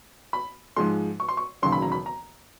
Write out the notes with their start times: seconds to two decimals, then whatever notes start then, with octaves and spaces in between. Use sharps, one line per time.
0.33 B5
0.76 G#2 F3 G#3 C6
1.20 C#6
1.29 C6
1.37 C#6
1.62 E1 D#2 C#3 F#3 C6
1.72 B5
1.82 A#5
1.92 B5
2.06 A#5